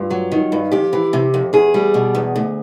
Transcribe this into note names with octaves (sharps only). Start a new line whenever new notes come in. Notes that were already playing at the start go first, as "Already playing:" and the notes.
Already playing: G2 F4
F#3
D#3
G2
F2 G4
E3
C3
F2
E2 G#4
G3
B2
E2
D2